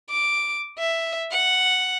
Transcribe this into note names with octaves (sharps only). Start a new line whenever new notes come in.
D6
E5
F#5